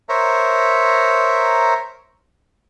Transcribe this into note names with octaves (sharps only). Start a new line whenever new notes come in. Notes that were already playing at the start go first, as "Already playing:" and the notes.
A#4 C5 C#5 E5 A#5